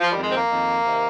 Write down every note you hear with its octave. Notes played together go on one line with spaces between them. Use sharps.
F3
F2 D#3 G3
G#3
C4
A#3
F2 D#3
C3 D#3